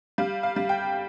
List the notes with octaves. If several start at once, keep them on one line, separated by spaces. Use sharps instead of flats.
G3 F5
F5
G3
G5